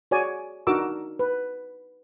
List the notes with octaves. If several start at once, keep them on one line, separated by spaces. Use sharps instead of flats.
F#4 G#4 C#5 D5 G#5
D4 D#4 F#4 A#4 D6 E6
B4